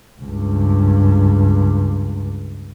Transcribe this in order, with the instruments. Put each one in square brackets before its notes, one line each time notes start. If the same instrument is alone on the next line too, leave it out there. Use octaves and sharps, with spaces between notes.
[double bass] C#2 G2